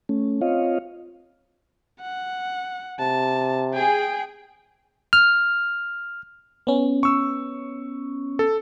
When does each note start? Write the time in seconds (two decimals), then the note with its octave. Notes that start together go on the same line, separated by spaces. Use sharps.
0.09 A3 C#4
0.41 C4 F4 C#5 D#5 F5
2.01 F#5
3.00 C3 A5
3.74 G#4 G5
5.13 F6
6.67 B3 C#4
7.03 C#6 E6
8.39 A4